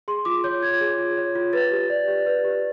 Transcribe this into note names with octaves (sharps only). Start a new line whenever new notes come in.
G#4 C6
F4 D6
C#5 G6
F4 G#6
G#4
F4
C#5
F4
B4 A6
G4
D5
G4
B4
G4